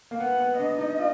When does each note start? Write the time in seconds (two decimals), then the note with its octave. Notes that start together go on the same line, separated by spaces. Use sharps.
0.11 A#3
0.20 B3 F#5
0.40 B3
0.59 D4 D#5
0.78 D#4
0.98 F4